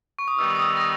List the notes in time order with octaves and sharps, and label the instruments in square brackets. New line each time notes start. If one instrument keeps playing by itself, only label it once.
[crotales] C#6
D#6
[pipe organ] D#3 G3 B3 D#4 [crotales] E6
[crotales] D#6
E6
A#6